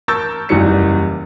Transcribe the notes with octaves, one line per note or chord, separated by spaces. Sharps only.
A#4 A5 C#6 E6 G6 A6
F#1 E2 E3 G3 C#7